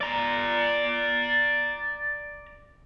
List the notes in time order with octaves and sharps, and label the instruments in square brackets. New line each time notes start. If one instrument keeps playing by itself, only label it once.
[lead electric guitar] D5 A#5